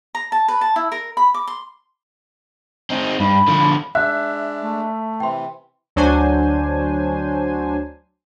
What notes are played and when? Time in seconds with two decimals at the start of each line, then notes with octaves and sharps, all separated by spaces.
0.15 A#5
0.32 A5
0.48 B4
0.61 A5
0.76 E4
0.92 A#4
1.17 B5
1.34 D6
1.47 C6
2.90 C4 D#4
3.20 G2 B5
3.48 D3 F3
3.95 G#3 D4 E5 F#6
4.63 A3
5.20 C3 E3 G5 C6
5.96 D2 F#3 D4 C5 G#5